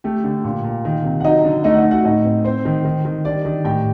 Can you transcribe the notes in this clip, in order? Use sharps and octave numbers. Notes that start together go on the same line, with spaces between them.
A3 G4
D3
A#2
A#2
D#3
C3
F#5
F#3 D#4 D#5
D3
A3 D#4 D#5
F#5
D#4 D#5
A3
F#4 F#5
A2 D#4 D#5
C4
C4 C5
D#3
D#3
D#3
G3 D4 D5
D#3
A2 G4 G5